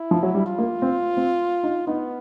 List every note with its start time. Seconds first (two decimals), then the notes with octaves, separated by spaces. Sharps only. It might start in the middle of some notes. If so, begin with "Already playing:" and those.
Already playing: E4
0.11 F3
0.23 F#3
0.35 G3
0.46 F4
0.58 A#3
0.82 C4
1.17 C4
1.63 D#4
1.87 B3 D#4